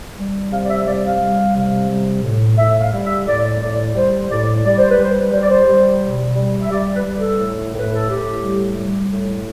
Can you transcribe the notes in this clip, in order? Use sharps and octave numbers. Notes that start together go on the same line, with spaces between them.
G3
C3 F5
D5
E5
G3 D5
F5
G3
C3
G3
A2
A2 E5
F5
G3
E5
A2 D5
A2 D5
G3 C5
A2 D5
G3 D5
C5
B4
G3 C5
G3 C5
D5
C5
G3
B2
G3
E5
G3 D5
B4
G3
A4
A2
A2
B4
A4
A2 G4
G3
G3
A2